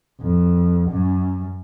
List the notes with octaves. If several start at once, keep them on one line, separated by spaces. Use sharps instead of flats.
F2
F#2